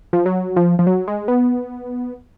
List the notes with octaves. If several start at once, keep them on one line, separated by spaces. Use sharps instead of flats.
F3
F#3
F3
F3
F#3
G#3
B3